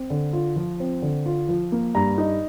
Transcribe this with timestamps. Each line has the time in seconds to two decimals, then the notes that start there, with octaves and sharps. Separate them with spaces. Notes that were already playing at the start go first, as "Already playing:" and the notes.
Already playing: C4
0.10 D3
0.33 F4
0.56 F3
0.80 C4
1.02 D3
1.26 F4
1.49 F3
1.72 A#3
1.95 G2 A#5
2.18 D#4